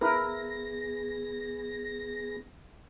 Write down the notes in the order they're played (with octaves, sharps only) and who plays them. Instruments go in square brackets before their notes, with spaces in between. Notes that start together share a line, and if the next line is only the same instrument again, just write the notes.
[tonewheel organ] B3 G#4 A#6 [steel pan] E4 A#4 B4